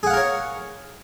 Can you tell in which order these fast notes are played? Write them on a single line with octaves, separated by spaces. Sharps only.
G#4 F#5 F5 A#4 C#5